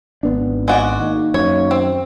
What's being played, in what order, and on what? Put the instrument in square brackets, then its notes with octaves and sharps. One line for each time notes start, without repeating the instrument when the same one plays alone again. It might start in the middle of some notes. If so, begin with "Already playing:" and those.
[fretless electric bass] G#1 B3 D4
[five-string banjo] G#3 F#4 D5
[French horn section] D#3 A#3 D#4
[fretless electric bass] F#2 [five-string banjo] C#5
[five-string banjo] C4